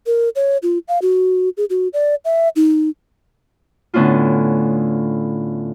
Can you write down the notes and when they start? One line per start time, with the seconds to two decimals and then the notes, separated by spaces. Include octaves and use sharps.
0.06 A#4
0.36 C#5
0.63 F4
0.88 F5
1.02 F#4
1.57 G#4
1.70 F#4
1.93 D5
2.25 E5
2.56 D#4
3.94 A2 D3 B3 C#4 E4 F4